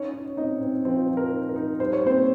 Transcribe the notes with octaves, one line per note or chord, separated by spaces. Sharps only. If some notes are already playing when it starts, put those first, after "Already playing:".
Already playing: C#4 D#4 C#5
D#4
C4 D#4 D#5
C4
F3 C4 C5
F3
A#4
D#4
A#4
D#4
G3 C5
C#5
A#3 C4 C5